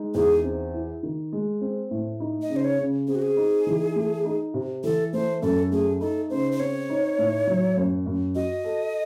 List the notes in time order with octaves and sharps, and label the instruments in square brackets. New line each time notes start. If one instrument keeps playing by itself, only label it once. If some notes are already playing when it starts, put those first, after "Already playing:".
Already playing: [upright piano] G#3 D#4
[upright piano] E2 [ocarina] G#4
[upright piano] C4
E4
D#3
G#3
C4
A2
D#4
[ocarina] D#5
[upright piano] C#3
[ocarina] C5
C#5
[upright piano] C#3
[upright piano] C4 [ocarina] G#4
[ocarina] F#4
G#4
[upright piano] D#4
E3
A3
D#4
C3
[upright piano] E3 [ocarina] A4
[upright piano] A3 [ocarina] C5
[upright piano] F#2 [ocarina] A4
[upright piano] A3 [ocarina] G#4
[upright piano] D#4 [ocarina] A4
[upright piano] C#3 [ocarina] C5
[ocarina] C5
[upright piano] C4 [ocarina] C#5
[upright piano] D#4
A2
F#3
F#2
F#2
[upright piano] F#4 [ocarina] D#5
[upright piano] A4